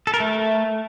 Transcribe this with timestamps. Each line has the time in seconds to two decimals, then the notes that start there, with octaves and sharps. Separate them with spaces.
0.07 A4
0.14 A#4
0.20 A3